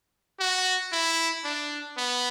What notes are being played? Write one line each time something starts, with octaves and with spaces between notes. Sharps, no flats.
F#4
E4
D4
B3